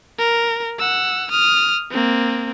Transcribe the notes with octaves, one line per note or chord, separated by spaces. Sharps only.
A#4
F#5 E6
D#6 F6
A#3 C4